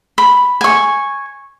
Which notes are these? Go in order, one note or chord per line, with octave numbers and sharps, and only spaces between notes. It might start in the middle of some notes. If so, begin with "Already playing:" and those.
B5
G#5 C#6